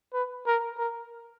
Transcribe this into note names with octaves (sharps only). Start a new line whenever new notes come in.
B4
A#4
A#4